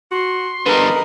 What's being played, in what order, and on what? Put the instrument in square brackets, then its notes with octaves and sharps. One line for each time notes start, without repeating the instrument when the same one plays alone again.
[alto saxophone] F#4 [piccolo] C6
[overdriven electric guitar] D3 G3 [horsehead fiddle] A#4 D#5 [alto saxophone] B4